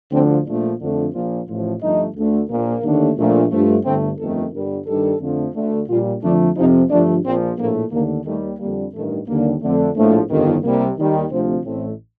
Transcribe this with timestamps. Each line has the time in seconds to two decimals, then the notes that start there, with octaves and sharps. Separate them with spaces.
0.12 D2 D3 F3 C4
0.46 A#1 A#2 F3 A3 D4
0.81 F2 D3 F3 A3
1.14 A#1 A#2 F3 F4
1.48 A1 A2 F3 F4
1.81 G1 G2 F3 A3 D#4
2.15 D2 D3 A3
2.49 A#1 A#2 F3 A#3
2.83 D#2 D3 A3
3.18 A#1 A#2 A3
3.52 G2 F3 A3
3.85 G1 G2 D3 A3 C4
4.18 G1 F2 D#3 A3 A4
4.52 G1 G2 D3 G3 A#4
4.87 G2 D#3 G3 A4
5.21 F2 D3 F3 A3
5.54 D2 D3 A3
5.88 A#1 A#2 G3 F4
6.23 F2 D3 F3 A3 D4
6.57 F2 C3 F3 D#4
6.90 G1 G2 F3 A3 D4
7.25 A#1 A#2 F3 C4
7.58 A#1 A2 A3 A#3
7.92 D#2 D3 A3 A#3
8.26 D#2 D#3 G3 A3
8.59 F2 D3 G3 A#3
8.94 A1 G2 D#3 A3
9.27 D#2 D3 G3 A#3
9.62 F2 D3 A3
9.95 A#1 A2 F3 A3
10.29 G1 F2 D#3
10.63 C2 C3 G3 A#3
10.98 D#2 D#3 G3
11.31 D2 C3 F3 C4
11.65 A1 A2 A3 C4